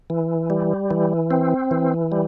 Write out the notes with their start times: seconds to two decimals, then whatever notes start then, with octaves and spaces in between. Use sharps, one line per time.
0.10 E3
0.50 G3
0.91 E3
1.31 C4
1.71 E3
2.12 G3